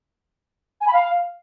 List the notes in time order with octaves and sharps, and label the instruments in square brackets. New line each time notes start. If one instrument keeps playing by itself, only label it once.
[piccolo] G#5
B5
F5